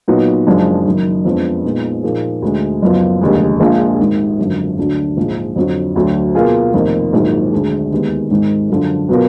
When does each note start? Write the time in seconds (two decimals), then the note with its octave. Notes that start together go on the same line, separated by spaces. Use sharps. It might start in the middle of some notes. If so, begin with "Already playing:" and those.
0.08 A#2 F#3 B3 D#4 F#4
0.47 F#1 F#2 F3 G#3 D4
0.86 F#1 F#2 D#3
1.25 F2 F3 G#3 B3 D4
1.64 A#2 G#3 B3 D#4
2.03 A#2 F3 A#3 D#4 G#4
2.42 D2 D3 G#3
2.82 F#1 F#2 F3 B3 F4
3.21 F1 D#2 D3 G#3
3.60 A#1 A#2 G#3 D4 F4
3.99 G#1 G#2 D#3
4.38 G#1 F#2 D3 F3
4.78 D2 D3 F#3 D4 F#4
5.17 A#1 G#2 F3 G#3 D#4
5.56 F2 D3 F#3
5.96 D2 D3 F#3
6.35 B2 A#3 F4 G#4
6.74 F1 F2 D#3 A#3
7.13 A#1 G#2 D#3 F#3
7.52 D2 D3 G#3 D4 G#4
7.92 D#2 D#3 G#3 B3
8.31 G#1 G#2 D#3 G#3
8.70 F#2 D3 F3
9.09 B2 F#3 B3 F4 A#4